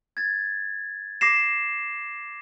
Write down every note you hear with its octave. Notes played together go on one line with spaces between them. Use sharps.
G#6 A6
D6 A#6 C7 E7